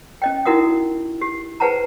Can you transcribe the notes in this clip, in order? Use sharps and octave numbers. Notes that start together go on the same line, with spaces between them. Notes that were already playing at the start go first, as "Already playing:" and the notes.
C#4 D#5 G5
D#4 E4 F#4 A#4 F#5 D#6
G4
G#4 B4 C5 F#5 A5 A#5